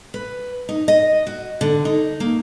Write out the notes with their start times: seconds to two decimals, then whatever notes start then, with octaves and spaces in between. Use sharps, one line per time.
0.14 B4
0.69 D#4
0.88 D#5
1.27 F#4
1.61 D3
1.85 D#4
2.20 A#3